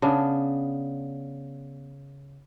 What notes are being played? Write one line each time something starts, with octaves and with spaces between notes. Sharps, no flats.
C#3 B3 D4